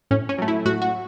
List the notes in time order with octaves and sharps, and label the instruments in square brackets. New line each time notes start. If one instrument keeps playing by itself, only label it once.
[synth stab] A2 C#4
C#4
F#3 A3
E4
A2 F#4
F#4